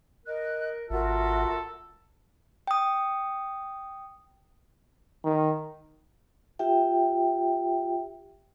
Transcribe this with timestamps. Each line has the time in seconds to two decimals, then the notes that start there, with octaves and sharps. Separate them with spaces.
0.25 A#4 D#5 F#6
0.90 G#1 F4 F#4 A4 A#4 E5
2.67 G5 D#6
5.24 D#3
6.59 F4 G4 E5 G5